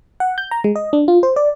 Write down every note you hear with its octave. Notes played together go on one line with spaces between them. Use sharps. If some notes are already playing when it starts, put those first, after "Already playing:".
F#5
G6
A#5
G#3
D#5
D4
F4
C5
D5